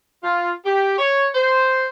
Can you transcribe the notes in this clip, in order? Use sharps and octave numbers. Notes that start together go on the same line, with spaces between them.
F4
G4
C#5
C5